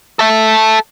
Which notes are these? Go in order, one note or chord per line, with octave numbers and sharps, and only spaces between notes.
A4 E5